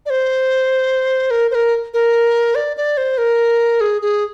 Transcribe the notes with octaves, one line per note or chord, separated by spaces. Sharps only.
D5
C5
A#4
C5
A#4
A#4
D5
D5
C5
A#4
G#4
G#4